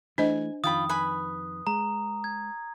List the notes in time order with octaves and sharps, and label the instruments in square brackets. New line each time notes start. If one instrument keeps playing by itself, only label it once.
[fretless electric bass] E3 A3 [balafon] D4 C5 D#5 [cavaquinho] G#5
[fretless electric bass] F2 D#3 [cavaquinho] F4 G5 B5 [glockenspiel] D#6
[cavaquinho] B4 G#5 B5
[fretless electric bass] G#3 [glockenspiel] A#5
[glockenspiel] G#6